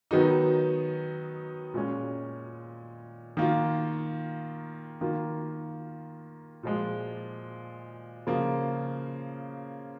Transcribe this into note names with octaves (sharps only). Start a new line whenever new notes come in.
D#3 F#3 B3 D#4
A#2 G#3 C#4
D#3 A#3 F4
D#3 A#3 F4
A#2 F3 G#3
C#3 F3 A#3 F4